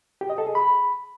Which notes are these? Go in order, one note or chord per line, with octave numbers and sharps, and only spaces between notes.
G4
D#5
A4
G#4
B5